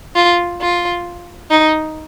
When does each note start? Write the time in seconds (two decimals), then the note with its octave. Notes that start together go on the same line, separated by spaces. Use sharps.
0.15 F4
0.61 F4
1.50 D#4